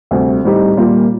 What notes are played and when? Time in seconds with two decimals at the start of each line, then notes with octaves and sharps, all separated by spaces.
0.11 D2 C3 G3 C4 G4
0.44 A2 G3 C4 D#4 G4
0.77 A#2 G3 A#3 F4 A#4